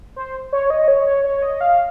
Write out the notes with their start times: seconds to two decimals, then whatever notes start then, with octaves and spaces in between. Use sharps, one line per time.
0.16 C5
0.53 C#5
0.70 D#5
0.88 C#5
1.06 C#5
1.24 C#5
1.42 D#5
1.61 F5